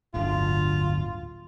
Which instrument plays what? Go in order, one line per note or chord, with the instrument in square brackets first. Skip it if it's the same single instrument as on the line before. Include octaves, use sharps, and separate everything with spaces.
[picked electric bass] D1 G1 D3 [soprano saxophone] F4